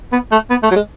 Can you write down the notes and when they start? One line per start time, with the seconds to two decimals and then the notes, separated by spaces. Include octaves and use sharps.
0.12 B3
0.31 A3
0.50 B3
0.63 A3
0.71 F#3
0.75 G#3